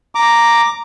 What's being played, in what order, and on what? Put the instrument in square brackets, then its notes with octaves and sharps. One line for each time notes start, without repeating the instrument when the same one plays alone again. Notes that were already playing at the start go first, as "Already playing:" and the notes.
[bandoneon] A#5 D6